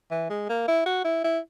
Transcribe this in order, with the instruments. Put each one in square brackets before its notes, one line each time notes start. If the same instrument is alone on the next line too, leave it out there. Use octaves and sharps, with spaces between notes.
[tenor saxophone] E3
G#3
A#3
E4
F#4
E4
E4